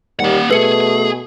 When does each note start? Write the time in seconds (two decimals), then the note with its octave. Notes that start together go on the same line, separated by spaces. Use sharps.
0.20 D#2 G3 A#3 F#5
0.51 B2 A3 G#4 B4 C#7